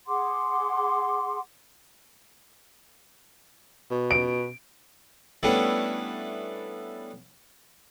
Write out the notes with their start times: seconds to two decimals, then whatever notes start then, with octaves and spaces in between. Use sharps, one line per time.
0.08 G#4 F#5 C6 D6
3.91 B2
4.11 D7
5.43 G3 A3 B3 C#4 D4 E4